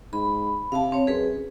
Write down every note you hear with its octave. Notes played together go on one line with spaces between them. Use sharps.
G#2 B5
C3 F5 A5
C4 C#5
F#2 G#4 B4